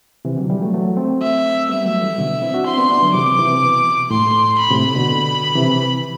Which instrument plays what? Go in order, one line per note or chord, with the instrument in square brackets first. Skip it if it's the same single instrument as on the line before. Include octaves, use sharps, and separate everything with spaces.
[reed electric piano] C3 E3
D3 F#3
E3 G3
F#3 A3
F#3 A3
A3 C4
[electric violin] E5
[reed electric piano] G3 B3 [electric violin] E5
[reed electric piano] F#3 A3
E3 G3
B2 D3
C4 E4
D4 F#4
[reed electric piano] C4 E4 [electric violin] C6
[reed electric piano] B3 D4
B3 D4
D3 F#3
[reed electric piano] C3 E3 [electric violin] D6
[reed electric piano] C3 E3
B2
[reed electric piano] A2 [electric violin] C6
[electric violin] B5
[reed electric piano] A2 C3
B2 D3
C3 E3